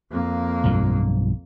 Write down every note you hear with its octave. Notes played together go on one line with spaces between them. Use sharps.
F2 A#3
B1 G2 F3